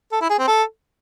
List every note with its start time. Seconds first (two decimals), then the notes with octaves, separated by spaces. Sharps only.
0.12 A4
0.21 E4
0.30 G#4
0.39 C4
0.48 A4